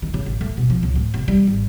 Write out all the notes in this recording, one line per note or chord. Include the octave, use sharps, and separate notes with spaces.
D#3
C#3
A1
A3
B2
F3
C#2
A2
F1
G3
G#1